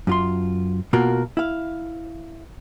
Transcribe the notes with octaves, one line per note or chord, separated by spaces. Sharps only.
F#2 F4 C6
B2 A#3 F4 F#4 A#4
E4 F5